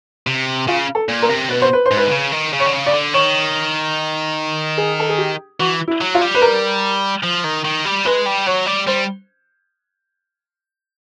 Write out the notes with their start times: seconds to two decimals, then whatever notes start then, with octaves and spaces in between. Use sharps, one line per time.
0.27 C3
0.68 C#3 F4
0.95 A4
1.09 A#2
1.22 A#4
1.29 C3
1.49 B2 B4
1.61 C5
1.73 B4
1.86 C5
1.91 G#2
1.97 B4
2.07 D3
2.11 C#3
2.32 D#3
2.53 C#3
2.60 C#5
2.66 D3
2.73 C#3
2.86 D5
2.94 D3
3.14 D#3 C#5
4.78 G#4
5.00 A4
5.09 G#4
5.18 G4
5.59 E3 F#4
5.88 E4
6.01 F#3
6.15 F4
6.21 G3
6.35 B4
6.42 A#4
7.23 F3
7.44 D#3
7.65 D#3
7.85 G3
8.05 G#3 B4
8.26 G3
8.47 F#3 C#5
8.67 G3
8.87 G3 C5